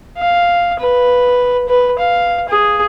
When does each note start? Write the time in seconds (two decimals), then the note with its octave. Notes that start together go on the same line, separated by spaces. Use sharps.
0.18 F5
0.79 B4
1.68 B4
1.99 F5
2.49 G#4